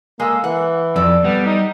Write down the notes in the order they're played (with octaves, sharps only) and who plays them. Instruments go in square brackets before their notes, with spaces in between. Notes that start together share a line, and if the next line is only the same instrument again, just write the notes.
[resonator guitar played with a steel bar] G#3 A4 [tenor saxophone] A#3
[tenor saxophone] E3 [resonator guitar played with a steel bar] F#5
[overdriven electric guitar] F2 [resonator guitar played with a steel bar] A4 D5
[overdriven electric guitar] G3 [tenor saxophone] B3
[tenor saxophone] D#4